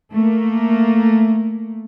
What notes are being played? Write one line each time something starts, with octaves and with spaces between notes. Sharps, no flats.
A3 A#3